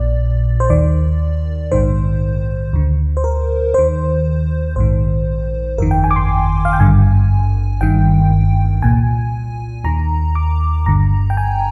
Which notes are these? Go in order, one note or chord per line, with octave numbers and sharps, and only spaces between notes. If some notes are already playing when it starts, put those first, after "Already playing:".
Already playing: A#1 A#2 D5
C5
D#2 D#3 D5
A#1 G#2 D#3 C5
D2 D3
C5
A#4
D#2 D#3 C5
A#1 G#2 D#3 C5
G1 F2 D#3 A#4
G5
G#5
D6
C6
F5
G5
G#1 G2 D3 G#5
G1 G2 D#3 G5
C2 A#2 G#5
D#2 D#3 A#5
D6
G1 G2 D3 A#5
G5
G#5